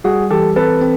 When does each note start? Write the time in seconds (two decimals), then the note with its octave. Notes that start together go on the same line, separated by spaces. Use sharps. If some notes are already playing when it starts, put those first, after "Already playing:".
0.04 G3 F#4 G#4
0.30 E3 G4 A4
0.56 C4 A4 B4
0.81 C4